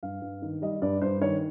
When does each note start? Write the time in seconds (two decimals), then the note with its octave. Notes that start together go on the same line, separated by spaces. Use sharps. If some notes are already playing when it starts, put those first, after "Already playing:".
0.03 G2 F5
0.22 G2
0.42 D#3
0.62 G3 D#5
0.82 G2 D5
1.02 G2 C5
1.21 D#3 C#5